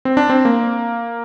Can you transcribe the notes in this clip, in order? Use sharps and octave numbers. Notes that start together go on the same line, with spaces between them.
C4
D4
C4
A#3